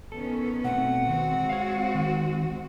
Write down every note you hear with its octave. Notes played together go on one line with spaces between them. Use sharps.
D#3 B3 C#4 A4
B2 A3 C4 F#5
D#3 G#3 C4 F#4
C#5 F5
D#3